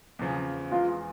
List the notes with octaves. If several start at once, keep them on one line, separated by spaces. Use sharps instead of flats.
E2 C#3 F3
E2 E3 G#3 F4